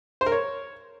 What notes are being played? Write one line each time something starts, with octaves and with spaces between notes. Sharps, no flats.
C5
A#4
C#5